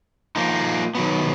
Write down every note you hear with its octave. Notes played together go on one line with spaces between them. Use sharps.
F3 A#3 D#4
D#3 F#3 B3